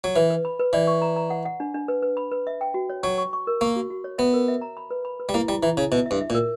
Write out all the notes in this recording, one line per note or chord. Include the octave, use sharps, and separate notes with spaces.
F#3
E3 B4
B4
B5
B4
E3 D5
C#6
A#5
A#5
F#5
F#5
D4
D4
B4
B4
B5
B4
E5
G5
F#4
C#5
F#3 C#6
C#6
C#6
A#4
A#3 C#6
F#4
F#4
C#5
B3 E5
A#4
E5
A#5
B5
B4
B5
B4
G3
A#3 E4
G3 E4
E3 E4
C#3 E4
B2 E5
E5
G2
E5
A#2
A#4